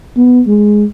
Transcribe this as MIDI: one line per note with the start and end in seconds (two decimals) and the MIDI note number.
0.17 0.41 59
0.47 0.84 56